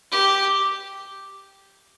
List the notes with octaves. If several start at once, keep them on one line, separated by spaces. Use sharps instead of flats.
G4